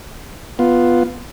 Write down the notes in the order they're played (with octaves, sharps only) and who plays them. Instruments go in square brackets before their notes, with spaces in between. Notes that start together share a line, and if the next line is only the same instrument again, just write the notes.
[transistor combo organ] B3 F4